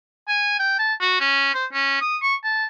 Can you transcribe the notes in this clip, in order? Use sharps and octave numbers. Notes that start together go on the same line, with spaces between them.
G#5
G5
A5
F#4
C#4
C5
C#4
D#6
C#6
A5